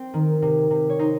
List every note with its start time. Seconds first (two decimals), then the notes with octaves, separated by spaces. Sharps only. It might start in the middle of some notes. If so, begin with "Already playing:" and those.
Already playing: C4 C5
0.14 D#3
0.42 C3
0.71 C3
0.90 C#5
0.99 D#4 C5